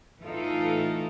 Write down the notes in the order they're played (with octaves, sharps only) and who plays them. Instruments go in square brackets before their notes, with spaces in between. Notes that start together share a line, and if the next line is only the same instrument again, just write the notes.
[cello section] A2 E3 A3 D#4 F4 A4